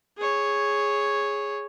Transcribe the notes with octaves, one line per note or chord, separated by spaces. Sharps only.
G#4 C#5